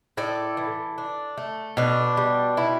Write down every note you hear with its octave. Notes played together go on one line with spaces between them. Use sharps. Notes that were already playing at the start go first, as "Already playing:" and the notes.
A2 A4 D5
E3
D4
A3
B2 D4
G3
B2 E4